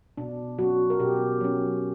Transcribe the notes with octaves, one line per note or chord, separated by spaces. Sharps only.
B2 D4
F#3 C#4 F#4
A#4
B2 G4
F#3 C#4